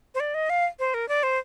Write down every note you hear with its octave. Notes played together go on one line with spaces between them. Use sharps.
C5
D5
D#5
F5
C5
A#4
D5
C5